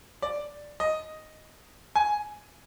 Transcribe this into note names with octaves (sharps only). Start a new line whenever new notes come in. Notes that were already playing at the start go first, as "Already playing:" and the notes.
D5
D#5
G#5